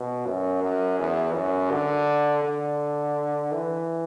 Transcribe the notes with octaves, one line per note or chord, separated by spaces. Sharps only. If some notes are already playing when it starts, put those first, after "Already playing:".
Already playing: B2
F#2
F#2
E2
F#2
D3
D3
E3